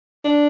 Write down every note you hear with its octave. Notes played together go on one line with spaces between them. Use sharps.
D4